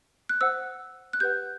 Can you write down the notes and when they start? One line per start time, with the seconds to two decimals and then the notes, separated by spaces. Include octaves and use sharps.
0.29 F#6
0.41 C5 F#5 E6
1.13 F#6
1.20 G4 B4 F#5 G6